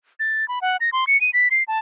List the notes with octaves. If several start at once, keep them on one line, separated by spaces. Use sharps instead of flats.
A6
B5
F#5
A#6
C6
C#7
D#7
B6
C7
A5